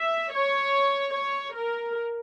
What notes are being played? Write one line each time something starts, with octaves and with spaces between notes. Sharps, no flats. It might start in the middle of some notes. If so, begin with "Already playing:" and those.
Already playing: E5
C#5
C#5
A#4